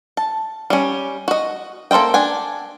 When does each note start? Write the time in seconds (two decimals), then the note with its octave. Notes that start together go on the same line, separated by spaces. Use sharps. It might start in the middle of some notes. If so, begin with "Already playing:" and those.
0.17 A5
0.70 G3 C#4
1.28 F#4 D#5
1.91 A#3 A4 C5 D#5 G5
2.14 D4 G5 G#5